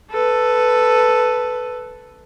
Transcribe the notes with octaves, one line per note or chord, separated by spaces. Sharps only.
A4 B4